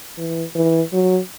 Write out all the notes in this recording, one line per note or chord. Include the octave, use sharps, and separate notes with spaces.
E3
E3
F#3